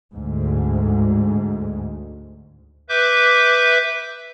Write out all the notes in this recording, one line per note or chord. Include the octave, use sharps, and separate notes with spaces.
D2 G#2
B4 E5 D6 G6